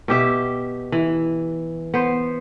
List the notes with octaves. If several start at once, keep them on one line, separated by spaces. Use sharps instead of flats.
B2 G4 E5
E3
B3 C5